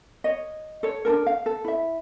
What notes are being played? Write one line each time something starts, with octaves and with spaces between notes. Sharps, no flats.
C#5 D#5
A4 C#5
D4 D#4 A4 A#4
F5
A4
E4 E5